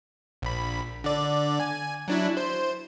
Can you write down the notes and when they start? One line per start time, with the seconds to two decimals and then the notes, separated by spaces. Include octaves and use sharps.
0.42 A#1 B5
1.04 D3 D5
1.60 G#5
2.08 F#3 D4 E4
2.37 C5